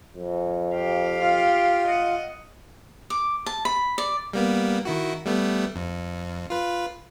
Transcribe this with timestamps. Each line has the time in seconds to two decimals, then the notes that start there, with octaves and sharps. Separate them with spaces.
0.16 F2
0.75 G4 F5
1.20 F4
1.88 D#5 F#5
3.10 D6
3.46 A5
3.65 B5
3.98 D5
4.33 G3 A#3 B3
4.85 D#3 E4 F#4
5.26 G3 A3 B3
5.76 F2
6.50 F4 B4